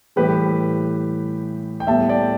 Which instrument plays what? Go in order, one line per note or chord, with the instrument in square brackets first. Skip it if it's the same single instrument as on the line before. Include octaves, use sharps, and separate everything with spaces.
[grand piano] A2 E3 G3 G4 B4
G5
A2 G3 B3 E5 A5
D5 G5